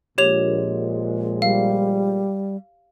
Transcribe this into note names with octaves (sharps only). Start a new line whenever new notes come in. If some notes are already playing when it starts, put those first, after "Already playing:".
A#1 A#2 G#3 G4 C#5 F7
G3 F5